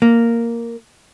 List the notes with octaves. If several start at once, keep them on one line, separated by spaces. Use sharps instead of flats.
A#3